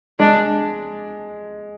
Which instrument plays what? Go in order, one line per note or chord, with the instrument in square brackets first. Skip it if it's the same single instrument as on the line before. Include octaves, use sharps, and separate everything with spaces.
[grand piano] G#3 [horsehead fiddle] D4